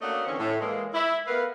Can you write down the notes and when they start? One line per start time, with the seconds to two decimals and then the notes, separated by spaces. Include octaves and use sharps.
0.01 A3 A#3 C#4 D4 F#4 D#5
0.25 D3 E3 C4 C#4
0.38 A2
0.60 E3 G#3 A#3
0.94 E4
1.27 A3 B3 A#4 B4 F5